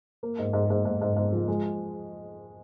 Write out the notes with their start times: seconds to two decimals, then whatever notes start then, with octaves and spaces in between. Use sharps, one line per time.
0.23 A#3
0.39 G#2
0.53 G#2
0.70 G#2
0.85 G#2
1.02 G#2
1.16 G#2
1.32 F3
1.48 G#3